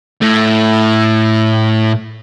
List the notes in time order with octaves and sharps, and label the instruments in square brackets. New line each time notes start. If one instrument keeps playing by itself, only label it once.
[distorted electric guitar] A2 A3